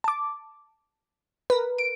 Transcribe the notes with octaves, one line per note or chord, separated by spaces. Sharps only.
A5 D6
A#4 B4
D7